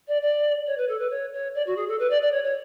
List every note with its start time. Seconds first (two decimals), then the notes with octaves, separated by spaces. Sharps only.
0.08 D5
0.22 D5
0.67 C#5
0.78 B4
0.89 A4
0.99 B4
1.11 C#5
1.33 C#5
1.55 D5
1.67 F#4
1.77 G#4
1.88 A4
2.00 B4
2.10 D5
2.22 D5
2.32 C#5
2.44 C#5